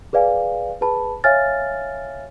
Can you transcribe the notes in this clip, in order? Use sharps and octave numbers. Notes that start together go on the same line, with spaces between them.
G#4 B4 D5 F5 G#5
G#4 B4 A5 B5
C#5 E5 F5 G#5 F6 A6